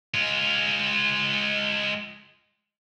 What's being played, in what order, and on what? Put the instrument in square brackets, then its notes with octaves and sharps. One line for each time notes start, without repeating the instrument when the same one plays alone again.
[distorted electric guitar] G#3 F4